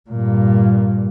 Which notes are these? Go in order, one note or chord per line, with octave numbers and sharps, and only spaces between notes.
G2 A#2